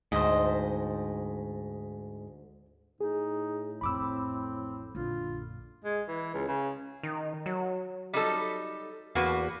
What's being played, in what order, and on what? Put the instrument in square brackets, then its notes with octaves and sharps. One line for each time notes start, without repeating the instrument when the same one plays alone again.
[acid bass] D2 [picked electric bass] G#2 [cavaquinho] C5 D#5
[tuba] A2 [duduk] D#4 [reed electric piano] G#4
[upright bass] A1 F2 [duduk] C4 [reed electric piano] B5 D6 E6
[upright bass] A#1 F#2 [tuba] D3 [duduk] F4
[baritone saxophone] G#3
E3
C#2
C#3
[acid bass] D#3
F#3
[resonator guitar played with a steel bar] G3 D#4 A4
[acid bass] E2 [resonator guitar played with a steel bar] A#3 F#4 B4